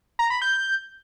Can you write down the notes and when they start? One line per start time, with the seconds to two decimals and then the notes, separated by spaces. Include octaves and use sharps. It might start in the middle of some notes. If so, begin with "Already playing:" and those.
0.19 A#5
0.30 B5
0.42 G6